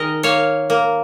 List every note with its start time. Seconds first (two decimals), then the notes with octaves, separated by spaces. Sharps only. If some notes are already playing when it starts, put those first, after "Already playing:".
Already playing: D#3 G#4 A#4 D#5
0.23 A#3 C#5 F5
0.70 A#3